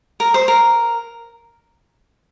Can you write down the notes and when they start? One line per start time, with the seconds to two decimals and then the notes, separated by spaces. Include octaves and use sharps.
0.20 A#4
0.34 C5
0.48 A#4